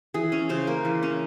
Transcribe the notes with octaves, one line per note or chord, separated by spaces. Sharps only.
E3 G#4
C#4
C#3 C5
A#3
E3
C#4